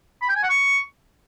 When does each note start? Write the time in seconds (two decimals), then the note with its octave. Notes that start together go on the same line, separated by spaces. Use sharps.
0.21 B5
0.28 G5
0.35 G#5
0.42 F#5
0.49 C#6